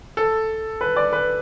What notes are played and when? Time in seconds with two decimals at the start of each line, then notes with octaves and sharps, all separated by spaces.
0.17 A4
0.81 B4
0.96 D5
1.13 B4